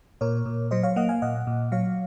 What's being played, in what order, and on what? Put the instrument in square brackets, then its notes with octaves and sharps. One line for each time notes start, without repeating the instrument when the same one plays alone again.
[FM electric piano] A#2 A#4 C#5
A#2
F#3 C5 D#5
C#5 F5
A#3 D#5 F#5
F5 G#5
A#2 D#5 F#5
A#2
F#3 C#5 F5